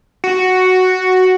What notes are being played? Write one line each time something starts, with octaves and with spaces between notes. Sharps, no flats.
F#4